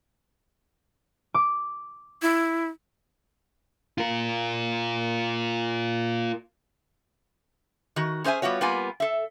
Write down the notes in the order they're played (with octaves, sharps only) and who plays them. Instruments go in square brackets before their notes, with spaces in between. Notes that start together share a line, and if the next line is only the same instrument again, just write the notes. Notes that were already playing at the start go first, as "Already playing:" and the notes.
[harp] D6
[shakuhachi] E4
[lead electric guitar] F4 A#4
[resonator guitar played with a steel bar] D#3 F#4
C#4 G#4 C5 E5 G#5
G3 B3 F4 F#4 C#5
G3 A#3 B3 F4 G#5
A4 E5